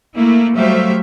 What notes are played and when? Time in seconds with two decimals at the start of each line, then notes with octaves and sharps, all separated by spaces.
0.16 A3 A#3 E4
0.55 F#3 G3 A3 C5 E5 F5